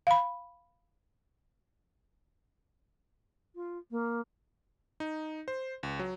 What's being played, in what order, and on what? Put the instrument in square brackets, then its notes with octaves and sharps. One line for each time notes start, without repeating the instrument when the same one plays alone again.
[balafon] F5 B5
[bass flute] F4
A#3
[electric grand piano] D#4
C5
C#2
F#3